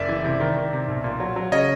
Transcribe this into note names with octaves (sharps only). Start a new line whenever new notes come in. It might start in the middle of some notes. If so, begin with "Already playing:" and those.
Already playing: F#1 D5 E5
E3
C3
D#3
D#3
C3
B1
A#2
F#3
F#3
C#3 C#5 D#5